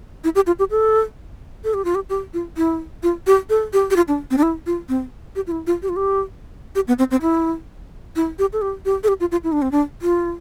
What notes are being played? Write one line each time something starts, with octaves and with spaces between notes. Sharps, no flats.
E4
G4
F4
G4
A4
A4
G4
F4
G4
G4
F4
E4
F4
G4
A4
G4
G4
F4
D4
C4
D4
E4
F4
C4
G4
F4
E4
F4
G4
F4
G4
G4
B3
C4
C4
E4
E4
G4
A4
G4
G4
A4
G4
F4
F4
E4
D4
C4
D4
F4